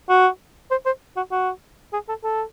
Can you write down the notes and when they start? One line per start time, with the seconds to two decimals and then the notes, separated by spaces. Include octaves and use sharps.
0.09 F#4
0.71 C5
0.86 C5
1.16 F#4
1.31 F#4
1.93 G#4
2.09 A4
2.24 A4